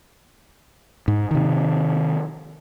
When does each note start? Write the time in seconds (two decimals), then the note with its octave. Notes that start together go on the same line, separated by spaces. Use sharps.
1.08 G#2
1.31 C3 D#3